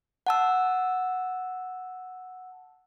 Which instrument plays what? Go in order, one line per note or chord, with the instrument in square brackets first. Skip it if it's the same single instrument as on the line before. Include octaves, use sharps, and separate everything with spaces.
[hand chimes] F#5 A5 E6